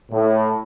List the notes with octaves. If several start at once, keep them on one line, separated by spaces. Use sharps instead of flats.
A2